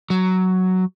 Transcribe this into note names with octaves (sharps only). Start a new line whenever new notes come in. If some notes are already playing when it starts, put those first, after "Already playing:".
F#3